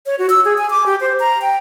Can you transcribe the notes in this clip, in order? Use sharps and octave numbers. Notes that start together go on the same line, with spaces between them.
C#5
F#4
E6
G#4
G#5
D6
G4
C5
A#5
G5